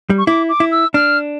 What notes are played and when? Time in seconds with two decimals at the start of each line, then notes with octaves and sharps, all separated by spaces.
0.10 G3
0.18 C#6
0.27 E4 D6
0.49 D6
0.60 E4
0.72 E6
0.94 D4 F6